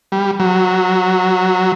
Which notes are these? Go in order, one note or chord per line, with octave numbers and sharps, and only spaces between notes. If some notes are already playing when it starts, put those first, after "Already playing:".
G3
F#3